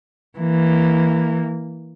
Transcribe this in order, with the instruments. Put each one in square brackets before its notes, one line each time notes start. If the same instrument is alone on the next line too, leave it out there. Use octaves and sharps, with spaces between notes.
[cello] E3 A#3